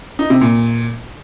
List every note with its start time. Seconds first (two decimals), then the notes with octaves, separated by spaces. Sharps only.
0.19 D#4
0.30 C3
0.41 A#2